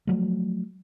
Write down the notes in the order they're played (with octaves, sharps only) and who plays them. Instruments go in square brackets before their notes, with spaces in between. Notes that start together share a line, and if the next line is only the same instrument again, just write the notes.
[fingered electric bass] F3 F#3 A3